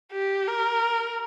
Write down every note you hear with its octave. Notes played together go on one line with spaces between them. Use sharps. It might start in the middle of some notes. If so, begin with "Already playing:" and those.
G4
A#4